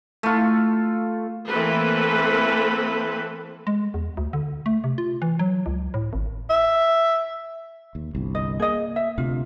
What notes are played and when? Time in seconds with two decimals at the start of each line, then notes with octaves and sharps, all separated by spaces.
0.23 A3 F4
1.49 E3 A3 A#3 C4 A4 B4
3.67 G#3
3.94 E2
4.17 D2
4.33 D3
4.66 A3
4.84 C3
4.98 F4
5.22 E3
5.39 F#3
5.66 C#2
5.94 A2
6.13 G#1
6.50 E5
7.95 D#2
8.15 G1 C2
8.35 D#5
8.60 A#3 G#4 D#5
8.96 E5
9.18 D2 C3 F4